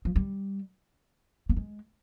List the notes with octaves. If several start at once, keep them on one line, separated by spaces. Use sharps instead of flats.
F3
G3
A#3
G#3